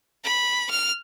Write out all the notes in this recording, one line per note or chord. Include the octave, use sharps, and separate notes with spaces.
B5
F6